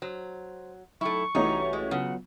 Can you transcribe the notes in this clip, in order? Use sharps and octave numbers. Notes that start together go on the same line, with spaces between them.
F#3 C5
F#3 A3 D#4 E4 G5 C#6
C2 E3 A3 C#4 D#4 F#4 G4
G#3
C#3 F#3 B3 F4 F#5